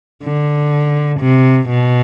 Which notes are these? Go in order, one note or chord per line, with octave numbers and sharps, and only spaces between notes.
D3
C3
B2